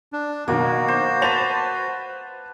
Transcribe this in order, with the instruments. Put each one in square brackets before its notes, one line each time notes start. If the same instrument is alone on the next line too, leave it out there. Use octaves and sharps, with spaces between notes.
[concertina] D4
[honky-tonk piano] B2 D#3 F#3 [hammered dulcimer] A#3 [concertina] F#4
[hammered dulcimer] C5
[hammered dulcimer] B4 A5 [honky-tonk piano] C5 A6 F7